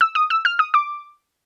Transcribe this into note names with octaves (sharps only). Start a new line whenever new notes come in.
E6
D#6
E6
F6
D#6
D6